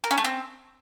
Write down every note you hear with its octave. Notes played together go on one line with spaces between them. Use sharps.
A#4
C#4
A3
C4